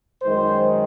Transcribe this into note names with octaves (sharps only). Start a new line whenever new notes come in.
F#2 D#3 G#3 C5